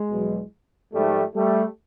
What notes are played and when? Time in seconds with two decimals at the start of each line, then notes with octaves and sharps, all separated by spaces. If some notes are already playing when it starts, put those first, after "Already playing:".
Already playing: G#3
0.09 E2 B2 F#3
0.93 G#2 F3 G3 A3
1.34 G3 A3